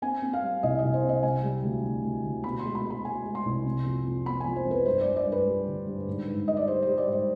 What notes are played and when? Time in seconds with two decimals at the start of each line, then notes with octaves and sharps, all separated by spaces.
0.02 C4 G#5
0.22 C4
0.33 F5
0.42 G3
0.63 C2 D#5
0.79 D#5
0.84 C2
0.94 C5
1.03 C4
1.09 D#5
1.23 C3 G#5
1.43 G3
1.63 D2
1.84 D2
2.03 D2
2.24 D2
2.44 B2 B5
2.59 C6
2.65 G#3
2.75 B5
2.85 G#3
2.90 B5
3.05 G#3 G#5
3.26 G#3
3.35 C6
3.45 C2
3.65 C3
3.85 F2
4.06 F2
4.26 B3 B5
4.40 G#5
4.46 F2
4.56 C5
4.67 F2 B4
4.86 G2 C5
5.01 D5
5.07 G2
5.17 D5
5.27 G2
5.32 B4
5.47 G3
5.67 D3
5.86 G2
6.07 G#2
6.27 G#2
6.47 G3 D#5
6.57 D5
6.67 G3 C5
6.82 G3 C5
6.98 D5
7.08 G#2 C5